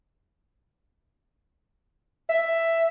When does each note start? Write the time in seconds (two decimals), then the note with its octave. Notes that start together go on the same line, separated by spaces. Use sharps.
2.30 E5